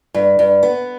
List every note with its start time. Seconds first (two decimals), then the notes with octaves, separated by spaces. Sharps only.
0.14 G2
0.39 G2
0.63 B3